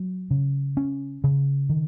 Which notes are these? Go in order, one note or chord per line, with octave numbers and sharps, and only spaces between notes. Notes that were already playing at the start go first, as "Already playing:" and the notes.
Already playing: F#3
C#3
C#4
C#3
D#3